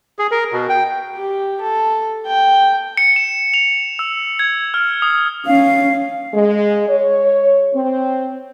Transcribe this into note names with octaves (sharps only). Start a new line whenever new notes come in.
G#4
A#4
B2
G5
G4
A4
G5
C#7
E7
F7
E6
G#6
F6
D#6
C#4 F5
G#3
C#5
C4